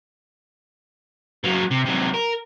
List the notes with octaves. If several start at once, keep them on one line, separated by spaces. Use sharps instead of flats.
F#3 A#3
C3
C3 F#3
A#4